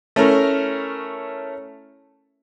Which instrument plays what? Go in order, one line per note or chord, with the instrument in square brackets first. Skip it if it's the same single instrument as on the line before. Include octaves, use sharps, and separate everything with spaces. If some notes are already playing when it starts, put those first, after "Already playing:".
[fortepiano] A3 C#4 E4 A#4